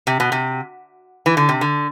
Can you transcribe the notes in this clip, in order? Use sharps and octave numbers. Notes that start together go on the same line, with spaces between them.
C3
B2
C3
E3
D3
C3
D3